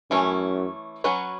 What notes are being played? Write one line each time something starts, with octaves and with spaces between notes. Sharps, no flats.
F#2 E3 A3 C#4
F#3 C#4 F#4 B4